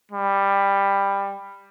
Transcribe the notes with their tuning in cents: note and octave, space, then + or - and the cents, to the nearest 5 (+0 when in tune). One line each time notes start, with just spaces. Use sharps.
G3 +15